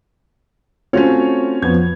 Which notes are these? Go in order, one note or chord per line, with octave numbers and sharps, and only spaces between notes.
A3 C4 C#4 F4 F#4 C5 C#5
F2 F3 B3 G#6